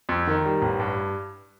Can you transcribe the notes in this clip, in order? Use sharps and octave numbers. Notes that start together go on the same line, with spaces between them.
F2
D#3
G3
A1
G2